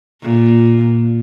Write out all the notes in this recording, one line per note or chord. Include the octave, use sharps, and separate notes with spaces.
A#2